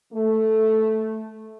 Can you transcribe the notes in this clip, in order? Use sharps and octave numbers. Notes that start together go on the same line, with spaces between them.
A3